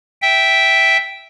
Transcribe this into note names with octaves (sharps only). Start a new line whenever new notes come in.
E5 G5